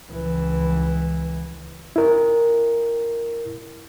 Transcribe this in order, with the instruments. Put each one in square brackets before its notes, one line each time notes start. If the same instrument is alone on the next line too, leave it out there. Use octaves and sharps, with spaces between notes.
[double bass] C#2 E3
[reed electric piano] E4 A#4